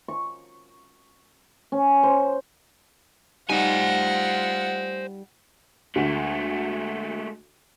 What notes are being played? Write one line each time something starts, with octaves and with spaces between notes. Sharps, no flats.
C#6
C#4
C5
G3 D#4 F4 C5 F#5 G#5
D2 G#3 A3